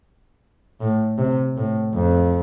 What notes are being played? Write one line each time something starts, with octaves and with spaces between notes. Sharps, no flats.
A2
C3
A2
F2